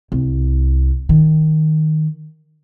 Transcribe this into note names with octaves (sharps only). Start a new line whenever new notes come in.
C2
D#3